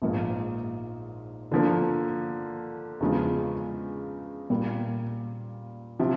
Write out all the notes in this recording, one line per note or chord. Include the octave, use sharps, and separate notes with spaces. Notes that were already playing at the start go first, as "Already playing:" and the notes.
A#1 G#2 F3 A#3
D3 F3 A#3
E2 C#3 F3 G#3
A#2 G3 A#3
C3 F3